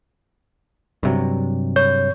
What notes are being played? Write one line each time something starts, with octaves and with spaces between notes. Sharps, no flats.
G2 C3 F#3
C#5 G6